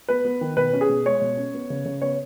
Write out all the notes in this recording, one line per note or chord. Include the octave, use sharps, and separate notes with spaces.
B3 B4
B3
D#3
B2 B4
C#4
G#4
B2
G#3 C#5
B2
C#4
B3
C#3
C#3
B3 C#5